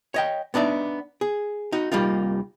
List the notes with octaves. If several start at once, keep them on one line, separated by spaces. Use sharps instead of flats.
C#5 D#5 G5
B3 D4 D#4 D5 E5
G#4
D#4 F#4
C2 G3 A#3 D#4 F4